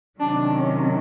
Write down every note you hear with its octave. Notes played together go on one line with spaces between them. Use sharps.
C3 D#3 F#3 D4
C#4